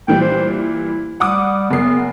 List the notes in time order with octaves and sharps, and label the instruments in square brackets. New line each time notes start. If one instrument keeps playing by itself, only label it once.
[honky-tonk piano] A#2 E3 G3 [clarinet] G5
[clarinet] C5
E4
[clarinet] G3 [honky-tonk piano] F#5 D6 D#6
[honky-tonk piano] F#1 A#4 C7 [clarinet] B3